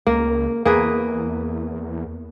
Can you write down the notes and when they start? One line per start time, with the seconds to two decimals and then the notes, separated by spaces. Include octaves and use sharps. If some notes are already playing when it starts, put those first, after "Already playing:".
0.07 C#2 A#3
0.65 E2 A#3 G#4 B4